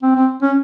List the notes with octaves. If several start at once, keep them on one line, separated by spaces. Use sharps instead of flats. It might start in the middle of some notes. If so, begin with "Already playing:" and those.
C4
C4
C#4